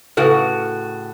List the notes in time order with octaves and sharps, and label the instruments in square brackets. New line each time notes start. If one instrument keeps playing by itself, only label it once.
[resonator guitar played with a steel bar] A2 C#3 F#4 [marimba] A4 B4